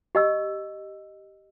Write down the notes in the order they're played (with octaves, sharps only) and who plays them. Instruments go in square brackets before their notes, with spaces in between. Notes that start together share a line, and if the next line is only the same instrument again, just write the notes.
[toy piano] G4 D#5 E6